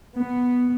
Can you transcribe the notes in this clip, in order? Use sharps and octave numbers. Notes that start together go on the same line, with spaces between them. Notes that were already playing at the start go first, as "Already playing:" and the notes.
B3